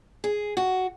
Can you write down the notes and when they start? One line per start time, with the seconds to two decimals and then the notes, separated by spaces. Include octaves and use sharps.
0.24 G#4
0.57 F#4